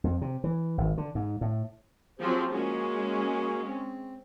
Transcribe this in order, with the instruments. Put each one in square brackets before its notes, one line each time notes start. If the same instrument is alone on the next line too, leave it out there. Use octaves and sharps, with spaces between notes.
[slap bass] F2
C3
E3
G#1
D3
G#2
A2
[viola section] F3 F#3 C4 [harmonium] G4 G#4 C5
[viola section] G#3 C#4 [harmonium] A#3 F#4 G#4
[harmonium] C4